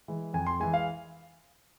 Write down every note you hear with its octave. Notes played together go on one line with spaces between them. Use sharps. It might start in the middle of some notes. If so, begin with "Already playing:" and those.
E3 G#3
F2 G#5
C6
E3 G#3 G#5
F5